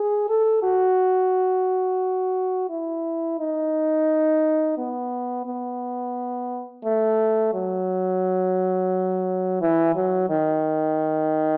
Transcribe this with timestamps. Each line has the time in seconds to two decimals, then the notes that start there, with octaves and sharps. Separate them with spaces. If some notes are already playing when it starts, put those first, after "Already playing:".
Already playing: G#4
0.29 A4
0.63 F#4
2.70 E4
3.39 D#4
4.78 B3
5.46 B3
6.84 A3
7.54 F#3
9.61 E3
9.96 F#3
10.30 D#3